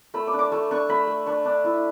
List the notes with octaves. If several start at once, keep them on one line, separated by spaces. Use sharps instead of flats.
A3 B5
D6
D4
D6
A3 C#6
D4 C#6
A3 B5
A3
D4 C#6
D4
E4